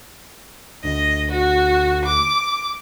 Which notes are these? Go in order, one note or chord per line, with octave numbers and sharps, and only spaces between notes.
D2 D#5
F#4
D6